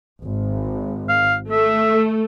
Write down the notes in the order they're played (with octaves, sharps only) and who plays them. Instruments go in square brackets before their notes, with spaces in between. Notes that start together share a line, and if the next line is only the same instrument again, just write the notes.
[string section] G#1
[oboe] F5
[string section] A3 [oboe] E5